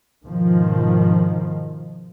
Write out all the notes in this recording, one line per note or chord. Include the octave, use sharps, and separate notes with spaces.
G#2 B2 D#3 F3